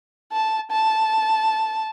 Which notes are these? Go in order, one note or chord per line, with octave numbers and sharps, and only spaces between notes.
A5
A5